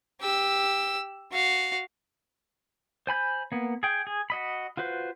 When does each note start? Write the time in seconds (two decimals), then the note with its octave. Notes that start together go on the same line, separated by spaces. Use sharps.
0.21 G4 E6
1.32 F#4 F5
3.07 C5 G#5 B5 G6
3.52 A#3 B3
3.83 G#4 G5
4.07 G#4
4.30 F#4 D#5 B5
4.77 F4 F#4 B4 C5